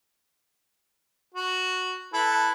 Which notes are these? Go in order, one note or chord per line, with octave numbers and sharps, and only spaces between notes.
F#4
E4 A4 B4